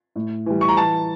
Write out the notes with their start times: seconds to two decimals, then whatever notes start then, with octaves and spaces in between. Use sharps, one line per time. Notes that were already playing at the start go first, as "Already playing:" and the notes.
0.16 A2
0.46 E3 G3
0.61 C#6
0.68 A#5
0.77 E3 A5